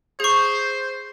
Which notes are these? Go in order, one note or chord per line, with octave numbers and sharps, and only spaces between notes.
G#4 C5 C#6